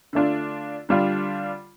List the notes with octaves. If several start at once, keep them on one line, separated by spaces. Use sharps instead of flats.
D3 A3 D4 F4
D3 G3 D4 F4